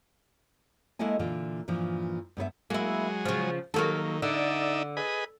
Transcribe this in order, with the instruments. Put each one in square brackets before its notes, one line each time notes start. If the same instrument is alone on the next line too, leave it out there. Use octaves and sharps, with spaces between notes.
[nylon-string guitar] G#3 A#3 E4 A4 D#5 G#5
A#2 D3 E3 F4
G2 A#2 E3 F3
G2 B3 B4 E5
[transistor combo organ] F#3 G#3 [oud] A#3 E4
[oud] C#3 F3
[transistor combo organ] D#3 [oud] F#3 A#3 A4
[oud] D3 [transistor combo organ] D#4 D5 E5
[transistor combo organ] G#4 B4 D#5